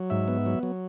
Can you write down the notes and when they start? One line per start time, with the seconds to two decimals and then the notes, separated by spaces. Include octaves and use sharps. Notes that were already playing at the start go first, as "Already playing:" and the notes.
Already playing: F#3
0.10 G#2 E5
0.28 B3
0.46 F#3
0.63 F#3